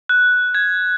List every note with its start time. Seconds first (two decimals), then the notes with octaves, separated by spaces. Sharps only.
0.09 F#6
0.55 G#6